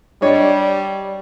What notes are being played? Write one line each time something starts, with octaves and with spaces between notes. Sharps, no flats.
G3 D4 C#5 D#5